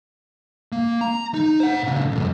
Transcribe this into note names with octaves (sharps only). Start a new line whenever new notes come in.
A#3
A#5
D#4
C5 F#5
A#2 C#3
C2 F2